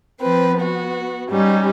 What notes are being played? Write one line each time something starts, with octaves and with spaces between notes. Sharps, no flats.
F3 C4 B4
B3 F#4
G#2 G3 C#4 D#4